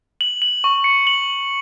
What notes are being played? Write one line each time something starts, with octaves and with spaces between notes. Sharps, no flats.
F#7
F#7
C#6
C#7
F#7